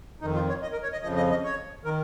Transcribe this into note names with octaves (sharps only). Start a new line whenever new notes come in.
F2 D#3 D#4
F4
C#5
D#5
A#4
C#5
D#5
F2 C#3 F3 D#5
D#5
D#5
C#5
D#3 A#4